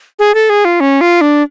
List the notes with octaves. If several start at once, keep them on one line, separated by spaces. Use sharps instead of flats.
G#4
A4
G#4
F4
C#4
F4
D4